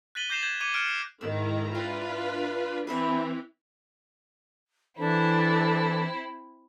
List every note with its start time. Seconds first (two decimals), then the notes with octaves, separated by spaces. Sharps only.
0.15 F#6 A6 B6 D#7 F#7 G7
0.29 D6 G6 A#6 C7 E7 F7
0.43 G6 G#6 C7 E7 F#7
0.61 D6 G#6 C#7 D#7 F7
0.74 F6 F#6 G#6 C#7 D7
0.88 C7
1.21 G#2 D#3 E4 A#5 E6
1.75 C4 D4 E4 F4 A#4 B4
2.87 E3 C4 B4 C5 E5
4.99 E3 C4 D4 E4 A4